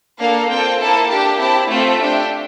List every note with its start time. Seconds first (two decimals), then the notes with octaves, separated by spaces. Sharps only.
0.18 A#3 D4 A4 F5
0.48 C4 F4 A4 G5
0.78 A#3 E4 A4 A5
1.08 D4 G4 A5
1.39 C4 E4 G4 A5
1.68 A3 C4 F4 A4 E5
1.99 D4 G4